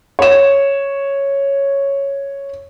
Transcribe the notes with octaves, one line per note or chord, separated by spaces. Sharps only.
C#5 E7